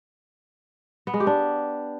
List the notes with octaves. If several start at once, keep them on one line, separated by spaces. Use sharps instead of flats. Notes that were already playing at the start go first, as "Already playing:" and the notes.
B3
G#3
G4
D4